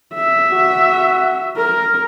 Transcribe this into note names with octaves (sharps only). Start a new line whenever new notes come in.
E5
F#4
A#4